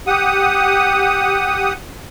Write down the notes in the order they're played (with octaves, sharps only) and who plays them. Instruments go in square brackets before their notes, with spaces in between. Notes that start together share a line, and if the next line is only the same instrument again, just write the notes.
[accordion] G4 F#5 D#6